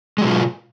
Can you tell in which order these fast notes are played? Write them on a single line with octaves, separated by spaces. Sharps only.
G#3 F#3 B2 F4